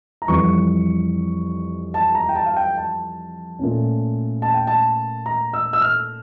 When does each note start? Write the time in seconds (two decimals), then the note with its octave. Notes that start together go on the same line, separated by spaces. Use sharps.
0.22 A#5
0.28 F2 E3 G3 C#6
1.94 A5
2.15 A#5
2.29 G5
2.35 A5
2.46 F5
2.56 G5
2.77 A5
3.59 A#2 A3 C#4
4.42 A5
4.54 G5
4.67 A5
5.26 A#5
5.53 E6
5.73 E6
5.82 F6